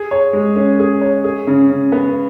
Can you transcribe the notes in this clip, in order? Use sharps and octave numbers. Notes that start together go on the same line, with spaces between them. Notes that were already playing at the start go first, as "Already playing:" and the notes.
Already playing: G#4
C#5
G#3
C#4
G#4
C#5
G#4
C#3
C#3
B3